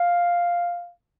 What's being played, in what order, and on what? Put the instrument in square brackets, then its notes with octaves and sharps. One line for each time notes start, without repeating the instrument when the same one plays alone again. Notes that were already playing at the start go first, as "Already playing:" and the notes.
Already playing: [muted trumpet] F5